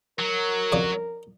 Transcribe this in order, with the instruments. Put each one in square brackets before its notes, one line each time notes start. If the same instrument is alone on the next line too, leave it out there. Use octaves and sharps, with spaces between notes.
[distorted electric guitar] F#3 [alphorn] A#4
[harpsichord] F2 C#3 D5